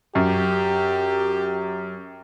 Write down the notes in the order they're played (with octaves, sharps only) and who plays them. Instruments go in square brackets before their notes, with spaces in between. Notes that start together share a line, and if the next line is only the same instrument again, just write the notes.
[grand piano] F#2 [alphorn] G4